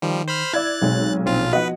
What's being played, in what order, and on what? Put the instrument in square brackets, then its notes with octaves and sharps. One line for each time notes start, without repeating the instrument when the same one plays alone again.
[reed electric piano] D#3 [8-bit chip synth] F3 G3
[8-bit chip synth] C5 B5 F6
[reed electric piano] E4 E6 [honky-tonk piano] D5 G#6 [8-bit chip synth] F#6 A6
[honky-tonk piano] B1 [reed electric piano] F#3 G#3 C4
[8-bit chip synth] A#1 F4 F5 [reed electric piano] C4
[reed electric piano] F3 B3 F#4 [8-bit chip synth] B4 [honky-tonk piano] D#5 F#5